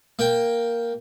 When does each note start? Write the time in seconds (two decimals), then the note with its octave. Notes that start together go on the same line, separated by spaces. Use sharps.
0.19 A#3 G5